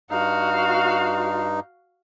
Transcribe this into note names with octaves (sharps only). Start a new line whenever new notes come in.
G2 D#4 F#4 F5